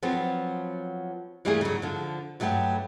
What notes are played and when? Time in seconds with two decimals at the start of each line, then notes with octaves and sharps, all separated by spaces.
0.03 F3 F#3 B3 C4
1.45 E3 G3 A3 A#3 G4 G#4
1.61 C#3 F#3
1.82 D3 F3
2.40 G2 F#3 A3 B3 G5